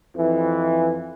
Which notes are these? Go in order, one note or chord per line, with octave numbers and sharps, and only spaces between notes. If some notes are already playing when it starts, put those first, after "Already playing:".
F2 E3